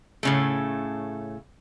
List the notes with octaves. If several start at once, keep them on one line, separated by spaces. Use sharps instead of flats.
A2 C#3 A3